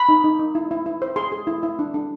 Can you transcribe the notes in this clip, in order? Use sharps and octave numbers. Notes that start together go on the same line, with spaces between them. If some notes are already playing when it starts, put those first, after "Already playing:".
Already playing: B5
D#4
D#4
D#4
E4
E4
E4
C5
G#4 C6
G#4
E4
E4
D4
D4